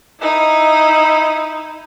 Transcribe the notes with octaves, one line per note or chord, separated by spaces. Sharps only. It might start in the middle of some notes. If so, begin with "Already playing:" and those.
D#4 E4